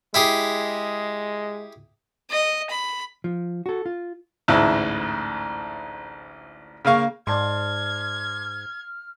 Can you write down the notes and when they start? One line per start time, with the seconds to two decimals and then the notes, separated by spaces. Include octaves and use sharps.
0.14 G#3 E4 G4 G#4
2.30 D#5
2.70 B5
3.24 F3
3.66 F#4 A4
3.86 F4
4.48 A1 D2 G#2 E4
6.85 C#3 A#3 F5 C#6
7.27 G#2 D5 A5 C6 F6 G#6